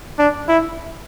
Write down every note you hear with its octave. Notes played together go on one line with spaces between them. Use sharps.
D4
E4